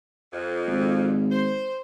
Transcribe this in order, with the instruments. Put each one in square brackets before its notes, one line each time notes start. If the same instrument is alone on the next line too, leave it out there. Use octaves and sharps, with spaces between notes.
[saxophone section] F2
[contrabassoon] G#1
[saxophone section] C5